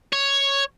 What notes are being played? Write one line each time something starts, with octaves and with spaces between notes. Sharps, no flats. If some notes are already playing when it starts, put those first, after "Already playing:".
C#5